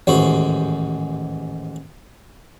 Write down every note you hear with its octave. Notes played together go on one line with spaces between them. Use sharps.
A1 D#2 G#2 F#4